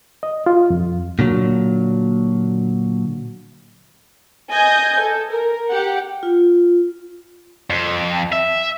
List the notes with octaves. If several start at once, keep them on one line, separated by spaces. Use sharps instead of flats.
D#5
F4
F2
A#2 D3 F#3
D#5 G#5 G6
A4
A#4
G4 F#5
F4
F2
E5